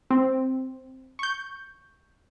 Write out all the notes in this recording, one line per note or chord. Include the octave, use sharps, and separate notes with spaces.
C4
C#6 G6